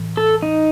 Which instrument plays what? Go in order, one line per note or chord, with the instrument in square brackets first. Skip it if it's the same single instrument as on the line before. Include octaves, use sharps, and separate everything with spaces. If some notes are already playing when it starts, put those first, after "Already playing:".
Already playing: [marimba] A2 E3
[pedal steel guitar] A4
D#4